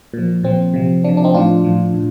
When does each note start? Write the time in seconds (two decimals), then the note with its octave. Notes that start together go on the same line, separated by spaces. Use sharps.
0.14 A#2 F3
0.43 A#2 F3 C4
0.74 C3 F3
1.04 C3 F3 D4
1.17 D4
1.24 C4 D#4
1.34 A2 F3 D4 F4
1.64 A2 F3
1.94 A2